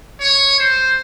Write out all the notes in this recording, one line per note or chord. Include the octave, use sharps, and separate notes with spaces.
C#5
C5